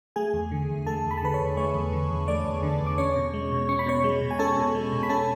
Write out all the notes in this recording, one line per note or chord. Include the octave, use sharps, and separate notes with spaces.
A3 G#4 G#5
E2
D3
E2
A3 A4 A5
E2
B5
A5
D3 B4 B5
C#5 C#6
E2
A3 C#5 C#6
E2
D3
E2
A3 D5 D6
E2
D3
E2
D6
C#4 C#5 C#6
B2
G#3
B2
C#4 C#6
B5
B2 C#5 C#6
G#3
B2
G#5
C#4 A4 A5
B2
G#3
B2
B5
C#4 A4 A5